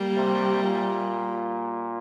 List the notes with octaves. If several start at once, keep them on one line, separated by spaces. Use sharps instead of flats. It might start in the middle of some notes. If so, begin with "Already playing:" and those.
Already playing: G3 A#3
C3
A#2